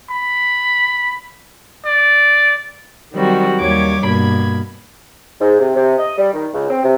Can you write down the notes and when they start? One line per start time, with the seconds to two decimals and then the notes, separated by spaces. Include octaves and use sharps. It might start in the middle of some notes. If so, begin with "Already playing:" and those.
0.10 B5
1.86 D5
3.13 D#3 F#3 G3 C4 F#4
3.60 D#2 G3 C#5 D6 G#6
4.04 G2 B2 A#3 B5 G#6
5.41 G#2
5.59 C3
5.75 C3
5.98 D#5
6.18 G3
6.33 D#3
6.54 C#2
6.70 C4
6.83 C3